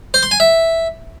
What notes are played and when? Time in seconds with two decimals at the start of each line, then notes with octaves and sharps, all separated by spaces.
0.14 C5
0.23 C6
0.31 G#5
0.40 E5